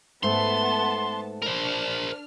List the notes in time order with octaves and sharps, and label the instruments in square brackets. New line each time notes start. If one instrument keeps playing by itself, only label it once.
[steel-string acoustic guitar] G#2 A3 [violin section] B3 A5 [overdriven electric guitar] C6
[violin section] D4 F6 [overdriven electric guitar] A#4 C5